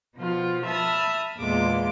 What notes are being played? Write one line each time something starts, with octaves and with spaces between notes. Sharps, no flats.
B2 F3 F4
E5 A5 B5 D#6 F6
E2 A#2 G#3 F4 D6